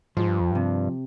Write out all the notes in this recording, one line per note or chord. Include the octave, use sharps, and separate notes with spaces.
G#2 F3
G2
F2
G2 C3